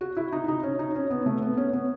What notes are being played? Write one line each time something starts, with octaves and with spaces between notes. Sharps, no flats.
F#4
E4
D#4
D#4
C#4
D#4
C#4
B3
A3
B3
C#4
B3